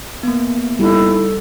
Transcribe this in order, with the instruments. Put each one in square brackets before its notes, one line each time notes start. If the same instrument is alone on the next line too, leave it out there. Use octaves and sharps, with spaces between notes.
[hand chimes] A#3 B3
[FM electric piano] G3 D#4 [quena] E4 [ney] A4